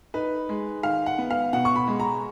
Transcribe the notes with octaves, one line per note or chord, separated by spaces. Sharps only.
D#4 B4
G#3
D#3 F5
F#5
B3
F5
B2 F#5
C#6
B5
G#3
A#5